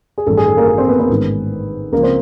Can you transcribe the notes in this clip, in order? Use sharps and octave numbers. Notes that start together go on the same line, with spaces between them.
G#4
A1 G2 D#3 A4
G#4
A4
A#3 A#4
A#3 A#4
C4 C5
B3 B4
B3 B4
A1 G#2 D#3
C#2 C#3 F3 A#3 A#4
C4 C5